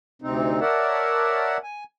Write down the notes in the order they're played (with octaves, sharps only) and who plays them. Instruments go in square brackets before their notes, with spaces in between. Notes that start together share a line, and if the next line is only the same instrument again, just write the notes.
[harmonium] D2 C3 C4 D#4
A#4 C#5 D5 E5 F#5 A5
G#5